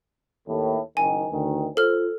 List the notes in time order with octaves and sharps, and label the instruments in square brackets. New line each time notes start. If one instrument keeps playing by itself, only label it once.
[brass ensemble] D#2 A2
[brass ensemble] F#1 D#3 [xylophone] G#5
[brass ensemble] D2 D#3
[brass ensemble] F4 C5 [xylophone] A4 F6